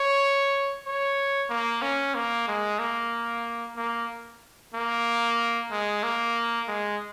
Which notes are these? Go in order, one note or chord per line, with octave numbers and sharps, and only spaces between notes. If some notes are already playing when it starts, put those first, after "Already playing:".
Already playing: C#5
C#5
A#3
C#4
A#3
G#3
A#3
A#3
A#3
G#3
A#3
G#3